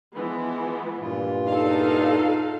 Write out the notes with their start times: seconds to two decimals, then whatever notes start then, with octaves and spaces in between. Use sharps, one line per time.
0.15 E3 F3 G#3 B3
0.97 G2 A#2 F4
1.47 E2 D#4 A4 F5